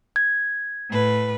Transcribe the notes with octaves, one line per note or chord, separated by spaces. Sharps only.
G#6
A2 B4